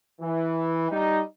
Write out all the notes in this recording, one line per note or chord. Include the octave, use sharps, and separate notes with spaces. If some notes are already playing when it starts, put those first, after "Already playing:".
E3
G3 D#4